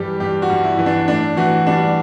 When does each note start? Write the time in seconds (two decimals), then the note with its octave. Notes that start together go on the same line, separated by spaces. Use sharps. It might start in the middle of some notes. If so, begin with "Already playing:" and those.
Already playing: G2 E3 G3 G4
0.20 G2 G4
0.42 F#4
0.50 G2
0.64 E4
0.79 E3
0.86 D4
1.08 A2 D4
1.37 E3 F#4
1.67 G3 D4